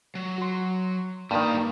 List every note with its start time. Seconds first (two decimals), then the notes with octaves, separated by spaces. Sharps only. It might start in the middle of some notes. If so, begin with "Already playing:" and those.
0.15 F#3
0.38 F#4 C6
1.31 G2 D#3 G3 A#3 A#5